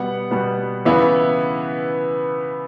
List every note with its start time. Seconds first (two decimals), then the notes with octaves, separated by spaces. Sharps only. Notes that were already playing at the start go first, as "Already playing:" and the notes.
Already playing: B2 G3 B3 F#5
0.31 B2 G3 B3
0.85 C#3 E3 B3 E4